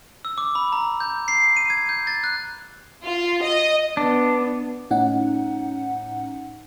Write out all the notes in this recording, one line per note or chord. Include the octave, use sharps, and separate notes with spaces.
E6
D6
B5
A#5
G6
C7
D#7
G#6
G6
A6
F#6
F4
D#5
B3 D4
A2 C#4 D#4 F#5